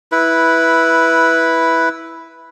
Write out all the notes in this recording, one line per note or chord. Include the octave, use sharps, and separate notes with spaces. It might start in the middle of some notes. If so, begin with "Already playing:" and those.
E4 B4